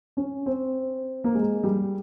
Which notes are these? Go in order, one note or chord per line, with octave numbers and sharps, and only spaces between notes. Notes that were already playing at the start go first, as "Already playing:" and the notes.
C#4
C4
A#3
G#3
G3